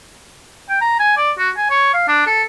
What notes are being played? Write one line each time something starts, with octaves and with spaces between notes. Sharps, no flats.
G5
A#5
G#5
D5
F#4
G#5
C#5
F5
D4
A4